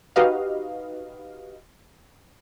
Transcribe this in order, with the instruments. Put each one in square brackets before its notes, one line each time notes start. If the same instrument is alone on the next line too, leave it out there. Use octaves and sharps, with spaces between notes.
[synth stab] D#4 F#4 G4 B4 D#5 F5